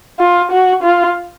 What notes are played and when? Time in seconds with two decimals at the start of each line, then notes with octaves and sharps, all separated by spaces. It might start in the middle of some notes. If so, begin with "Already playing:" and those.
0.19 F4
0.51 F#4
0.83 F4